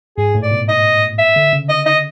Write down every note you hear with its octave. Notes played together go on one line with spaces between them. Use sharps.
G#2 G#4
A2
D5
B2
D#5
E5
D3
C#3
D#5
D#5